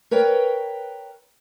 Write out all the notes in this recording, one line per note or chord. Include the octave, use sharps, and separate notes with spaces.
A#4 B4 C#5 G5